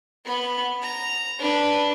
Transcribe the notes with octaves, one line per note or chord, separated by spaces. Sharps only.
B3 B5
A#5
D4 B4